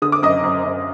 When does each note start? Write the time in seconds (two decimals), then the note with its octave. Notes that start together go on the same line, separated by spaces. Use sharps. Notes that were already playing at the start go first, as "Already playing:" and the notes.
0.02 D3 D#6
0.12 D6
0.22 F#2 D#5 D#6
0.43 F#2
0.64 F#2